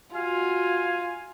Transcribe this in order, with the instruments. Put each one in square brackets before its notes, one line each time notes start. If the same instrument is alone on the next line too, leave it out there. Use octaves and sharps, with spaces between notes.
[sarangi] F4 [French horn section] F#4 [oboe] F5 [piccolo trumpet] G#5